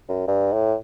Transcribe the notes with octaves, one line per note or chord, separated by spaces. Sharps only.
F#2
G2
A2